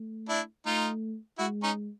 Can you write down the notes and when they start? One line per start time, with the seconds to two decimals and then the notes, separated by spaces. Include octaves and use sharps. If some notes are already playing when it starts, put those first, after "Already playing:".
Already playing: A3
0.29 D4 E4
0.66 A3 D#4 F4
1.38 G#3 E4 F#4
1.63 C#4 D#4